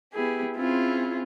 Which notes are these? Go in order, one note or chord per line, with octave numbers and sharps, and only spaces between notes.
B3 E4 G4 G#4
C4 C#4 E4 F4 G#4